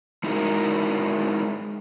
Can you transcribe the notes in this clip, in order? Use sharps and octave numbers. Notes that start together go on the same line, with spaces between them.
G#3 D#4 E4 F#4 G#4 A#4